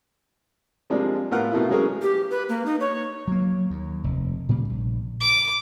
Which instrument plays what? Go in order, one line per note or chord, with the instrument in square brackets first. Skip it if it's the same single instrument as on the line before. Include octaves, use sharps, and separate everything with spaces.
[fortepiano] C3 F3 G3 G#3 A#3 D4
A2 B3 F4 A#4 F#5 F#6
B2 E3 A3 A#3 E4
F#3 G#3 B3 C#4 G#4 A#4
[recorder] G4
B4
A#3
D#4
C#5
[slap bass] F#3 A#3
D#2
F1
A#2 C#3 G3 A#3
A#1
[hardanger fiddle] D6